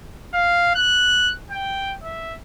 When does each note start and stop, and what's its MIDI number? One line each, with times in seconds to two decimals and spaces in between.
0.34 0.74 77
0.75 1.32 90
1.50 1.94 79
2.03 2.36 76